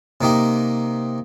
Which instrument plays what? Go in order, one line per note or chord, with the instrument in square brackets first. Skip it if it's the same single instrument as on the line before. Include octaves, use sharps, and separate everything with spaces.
[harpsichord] C3 A#3 D#4 G4